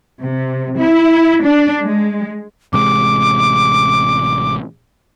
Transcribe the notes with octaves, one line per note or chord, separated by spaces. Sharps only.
C3
E4
D4
G#3
A1 C3 G#3 D6